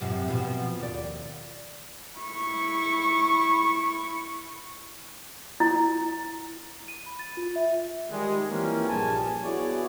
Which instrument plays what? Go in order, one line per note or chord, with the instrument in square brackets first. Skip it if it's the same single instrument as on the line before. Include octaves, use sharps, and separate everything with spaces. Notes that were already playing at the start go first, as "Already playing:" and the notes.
[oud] F#2 C3 F3
B2 F3
D#2 D5
[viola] E4 C#6
[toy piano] E4
[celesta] D#7
B5
A6
F4
E5
[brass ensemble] D#3 G3 G#3
E3 F3 G3 A#3 C4 C#4
A#1 G2 G3 G#4 G#5 A5
B3 E4 F#4 G#4 C#5 D5